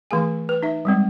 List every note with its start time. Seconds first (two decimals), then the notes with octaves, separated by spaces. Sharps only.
0.11 E3 A3 G#4 G#5
0.49 B4
0.63 D#4 E5
0.85 G3 G#3 C4